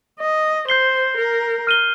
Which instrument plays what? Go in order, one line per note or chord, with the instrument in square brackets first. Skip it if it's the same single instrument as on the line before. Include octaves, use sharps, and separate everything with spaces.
[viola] D#5
[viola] C5 [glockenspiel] G6 C7 G7
[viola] A#4
[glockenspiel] F6 D#7 G7